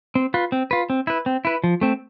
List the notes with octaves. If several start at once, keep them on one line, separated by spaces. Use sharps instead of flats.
C4
F4 B4
C4
F4 B4
C4
E4 B4
C4
E4 B4
F3
A3 C4